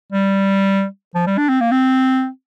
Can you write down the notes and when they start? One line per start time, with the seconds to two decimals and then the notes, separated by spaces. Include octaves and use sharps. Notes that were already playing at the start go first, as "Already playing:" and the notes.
0.13 G3
1.15 F3
1.27 G3
1.38 D4
1.49 C4
1.61 A#3
1.72 C4